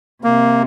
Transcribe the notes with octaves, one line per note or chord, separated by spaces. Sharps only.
C3 A#3